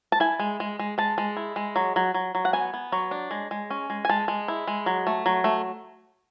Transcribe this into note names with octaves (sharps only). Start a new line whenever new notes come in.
A5
E4 G#5
G#3
G#3
G#3
G#3 A5
G#3
E4
G#3
F#3
F#3
F#3
F#3
F#5
B3 G#5
B3
F#3 C#5
D4
G#3
G#3
C#4
G#3
G#5
G#3 A5
G#3
E4
G#3
F#3
A3
F#3
A3